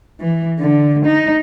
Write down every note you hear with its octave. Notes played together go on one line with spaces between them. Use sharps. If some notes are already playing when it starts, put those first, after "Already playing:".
E3
D3
D#4